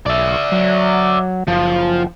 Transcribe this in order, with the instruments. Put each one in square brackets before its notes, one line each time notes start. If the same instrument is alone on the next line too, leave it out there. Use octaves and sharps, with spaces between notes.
[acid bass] B1 [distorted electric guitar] D5 E5
[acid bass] F#3
[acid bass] F#1 [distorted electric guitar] F3